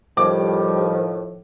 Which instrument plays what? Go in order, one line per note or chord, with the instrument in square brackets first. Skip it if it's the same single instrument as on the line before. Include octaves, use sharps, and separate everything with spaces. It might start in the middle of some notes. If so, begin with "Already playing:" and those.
[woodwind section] A2 D#3 F3 [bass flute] G3 [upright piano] D6